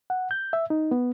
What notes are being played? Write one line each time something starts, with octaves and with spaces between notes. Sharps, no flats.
F#5
G6
E5
D#4
B3